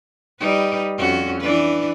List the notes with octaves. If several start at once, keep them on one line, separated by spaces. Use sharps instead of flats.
G3 D#4 B4
F2 C#4 F#4
E3 D4 B4